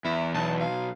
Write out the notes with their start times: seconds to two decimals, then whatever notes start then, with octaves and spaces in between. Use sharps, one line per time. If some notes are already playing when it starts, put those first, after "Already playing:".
0.05 E2 E4
0.34 B1 A5
0.60 F5